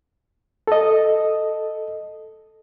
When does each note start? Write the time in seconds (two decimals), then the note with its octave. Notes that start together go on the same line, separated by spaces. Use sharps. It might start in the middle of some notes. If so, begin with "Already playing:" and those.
0.67 A4 D#5